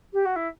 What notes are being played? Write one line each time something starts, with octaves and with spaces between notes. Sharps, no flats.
G4
F#4
E4